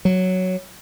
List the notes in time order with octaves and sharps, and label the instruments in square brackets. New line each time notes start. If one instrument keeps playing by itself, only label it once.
[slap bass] F#3